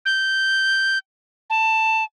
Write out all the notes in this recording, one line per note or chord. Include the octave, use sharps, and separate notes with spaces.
G6
A5